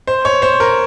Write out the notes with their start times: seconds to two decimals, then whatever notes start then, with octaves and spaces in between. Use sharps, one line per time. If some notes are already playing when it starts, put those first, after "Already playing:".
0.07 C5
0.25 C#5
0.42 C5
0.60 A#4